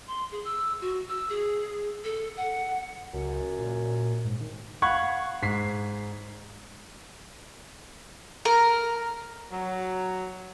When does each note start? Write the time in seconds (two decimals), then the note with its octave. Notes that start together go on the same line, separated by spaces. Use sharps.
0.08 C6
0.32 G#4
0.45 E6
0.81 F#4
1.09 E6
1.30 G#4
2.04 A4
2.37 F#5
3.14 C#2 F#2
3.59 A#2
4.25 G#2
4.41 D#3
4.82 F5 F#5 B5 C#6 F#6 G#6
5.42 G#2 B6 C7
8.45 A#4
9.51 F#3